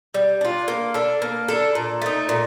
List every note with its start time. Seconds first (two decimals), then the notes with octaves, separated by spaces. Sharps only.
0.14 G3
0.41 D4 F4
0.68 A#3
0.94 D4 A4
1.22 A#3
1.48 D4 A4
1.75 A#2
2.02 A3 D#4
2.29 A#2